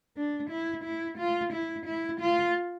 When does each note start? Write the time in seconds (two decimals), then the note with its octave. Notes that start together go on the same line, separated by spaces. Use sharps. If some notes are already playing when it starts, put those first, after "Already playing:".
0.17 D4
0.50 E4
0.84 E4
1.18 F4
1.53 E4
1.86 E4
2.20 F4